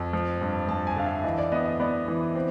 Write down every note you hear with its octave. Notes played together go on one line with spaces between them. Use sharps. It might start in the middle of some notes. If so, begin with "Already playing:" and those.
Already playing: F2
F3
G2
F3 A5
G#5
D3 F5
E5
E3 D#5
D5
B3 D#5
D#5
B3 D5
E3
C4